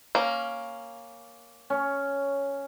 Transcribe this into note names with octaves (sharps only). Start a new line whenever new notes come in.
A#3 C#4
C#4